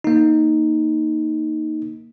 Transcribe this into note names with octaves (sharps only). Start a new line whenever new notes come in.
A#3 D#4